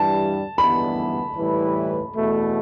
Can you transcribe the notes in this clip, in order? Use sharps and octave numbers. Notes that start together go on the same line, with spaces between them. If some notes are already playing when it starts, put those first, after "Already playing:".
Already playing: G2 E3 G3 A5
G2 E3 G3 B3 B5
A2 E3 G3 E4 B4
E2 B2 A3